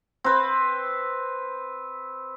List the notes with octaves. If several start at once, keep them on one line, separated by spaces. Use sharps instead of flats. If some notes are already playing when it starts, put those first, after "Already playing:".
C4 B4